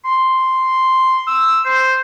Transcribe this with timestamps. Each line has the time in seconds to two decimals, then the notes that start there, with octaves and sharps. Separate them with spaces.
0.05 C6
1.27 E6
1.65 C5